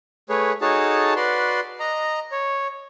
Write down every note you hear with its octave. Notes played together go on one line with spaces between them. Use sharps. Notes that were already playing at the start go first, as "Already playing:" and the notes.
A3 G#4 B4 C#5
D#4 F#4 G#4 A4 C#5 A5
F#4 B4 D5 C6
D#5 A#5
C#5